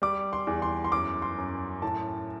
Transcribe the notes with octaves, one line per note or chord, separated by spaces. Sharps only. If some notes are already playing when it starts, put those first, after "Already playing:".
G3 D6
C6
E2
C6
C6
F#2 D6
C6
F#2
A2 A5